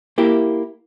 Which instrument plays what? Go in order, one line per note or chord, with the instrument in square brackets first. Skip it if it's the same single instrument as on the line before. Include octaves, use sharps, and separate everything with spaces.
[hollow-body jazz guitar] A#3 E4 G4